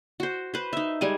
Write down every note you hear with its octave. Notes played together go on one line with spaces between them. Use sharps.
F#4 C5
B4 C5
D#4 E5
G3 G#3 G#5